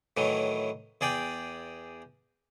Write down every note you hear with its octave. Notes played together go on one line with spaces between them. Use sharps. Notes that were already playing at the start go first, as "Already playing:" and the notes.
A2 D#3 E3 F#3
E2 G#4 D5 G5